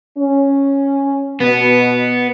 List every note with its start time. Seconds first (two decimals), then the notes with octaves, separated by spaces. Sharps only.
0.17 C#4
1.40 B2 B3